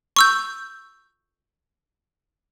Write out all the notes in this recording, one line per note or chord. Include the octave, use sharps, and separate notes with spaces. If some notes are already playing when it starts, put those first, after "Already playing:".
C#6 E6 G6